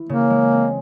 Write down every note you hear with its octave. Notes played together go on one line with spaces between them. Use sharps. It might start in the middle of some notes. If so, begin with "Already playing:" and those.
Already playing: E3
C#3 A#3
G#3
C4